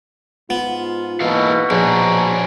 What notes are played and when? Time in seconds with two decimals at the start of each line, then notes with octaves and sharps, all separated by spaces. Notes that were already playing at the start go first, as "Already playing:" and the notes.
0.50 G#2 B3 F4
1.20 G#2 B2 E3 A#3 A4 F5
1.70 A#1 D4 G#4 C5 C#5 A5 A#5